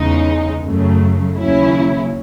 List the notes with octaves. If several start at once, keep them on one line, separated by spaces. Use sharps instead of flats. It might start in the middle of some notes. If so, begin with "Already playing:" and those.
Already playing: E2 C#3 G#3 D#4
F#2 C#3 F#3 A3
D#2 C#3 F#3 C#4 E4